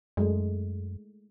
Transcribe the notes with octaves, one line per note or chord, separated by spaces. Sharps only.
F#2 G#3 A3